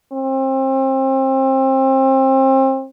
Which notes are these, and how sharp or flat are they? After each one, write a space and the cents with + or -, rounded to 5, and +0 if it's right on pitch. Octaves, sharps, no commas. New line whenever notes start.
C4 +30